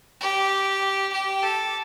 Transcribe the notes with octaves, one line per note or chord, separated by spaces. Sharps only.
G4
G4
A4